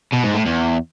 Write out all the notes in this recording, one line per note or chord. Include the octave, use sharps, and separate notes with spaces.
B2
G#2
A2
E2